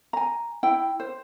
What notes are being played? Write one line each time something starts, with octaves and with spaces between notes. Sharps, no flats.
G#5 A#5
E4 G5
C5